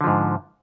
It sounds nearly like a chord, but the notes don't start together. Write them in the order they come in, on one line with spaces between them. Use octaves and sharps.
D3 F3 G#2